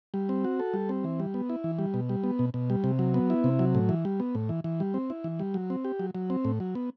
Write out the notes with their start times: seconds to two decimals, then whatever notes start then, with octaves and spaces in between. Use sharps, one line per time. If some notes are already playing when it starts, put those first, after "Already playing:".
0.14 G3
0.29 C4
0.44 F#4
0.60 A4
0.74 G3
0.89 C4
1.04 E3
1.20 G3
1.34 B3
1.50 E4
1.64 E3
1.79 G3
1.94 B2
2.09 G3
2.24 B3
2.39 B2
2.54 B2
2.70 G3
2.84 C3
2.99 F#3
3.14 B3
3.30 E4
3.44 C3
3.59 F#3
3.75 A2
3.89 E3
4.05 G3
4.20 B3
4.35 A2
4.49 E3
4.64 E3
4.80 G3
4.94 C4
5.10 E4
5.24 E3
5.39 G3
5.54 F#3
5.70 C4
5.85 G4
6.00 F#3
6.15 F#3
6.30 C4
6.45 A2
6.60 F#3
6.75 B3